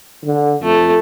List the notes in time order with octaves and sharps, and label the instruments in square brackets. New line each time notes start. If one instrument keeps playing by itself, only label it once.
[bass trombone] D3
[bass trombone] F2 [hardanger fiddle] A3